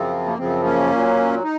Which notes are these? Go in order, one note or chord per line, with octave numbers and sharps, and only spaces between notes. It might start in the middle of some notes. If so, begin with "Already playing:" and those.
Already playing: F#2 C#3 F3 C4
A#3
F#2 C#3 F3 C4
A#3 C#4
A#2 F#3
D#4